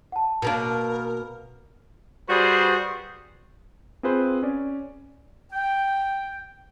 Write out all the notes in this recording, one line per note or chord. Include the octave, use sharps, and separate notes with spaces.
F#5 A5
B2 A#3 D4 A#4
G3 F#4 G#4 B4 C5
C4 F4 G#4 B4 C5
C#4 D5
G5